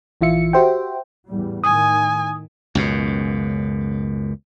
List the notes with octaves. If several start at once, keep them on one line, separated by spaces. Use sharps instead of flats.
A#1 E3 F4 E5 C#7
F#4 G4 C5 E5 G5
E2 A2 G3
A2 D#3 G#5 D#6
C#2 F#2 B2